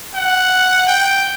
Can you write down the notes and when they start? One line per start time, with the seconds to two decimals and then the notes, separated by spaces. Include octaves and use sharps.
0.15 F#5
0.87 G5